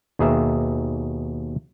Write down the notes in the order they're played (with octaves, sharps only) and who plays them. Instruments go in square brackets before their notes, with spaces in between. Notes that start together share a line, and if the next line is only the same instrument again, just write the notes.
[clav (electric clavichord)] D#2 B2 G#4 A#4 E5